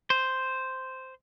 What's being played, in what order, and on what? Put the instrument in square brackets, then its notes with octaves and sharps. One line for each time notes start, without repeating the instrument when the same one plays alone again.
[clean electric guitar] C5